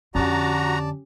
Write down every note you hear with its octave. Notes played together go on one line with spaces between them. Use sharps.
F2 D3 C#4 F#4 G4 D5 A5 A#5